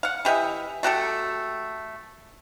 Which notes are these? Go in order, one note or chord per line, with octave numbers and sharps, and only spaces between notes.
F5 F#5
E3 G4 D#5 E5
A3 F#4 G4 A4